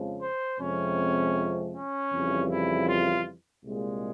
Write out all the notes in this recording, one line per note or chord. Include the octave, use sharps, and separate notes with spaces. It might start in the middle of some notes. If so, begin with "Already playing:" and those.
Already playing: F2 C#3 F3 G#3
C5
F2 C3 F3 G#3 C#4
C#4
F2 C#3 E3 G3
E4
F4
C2 A#2 G#3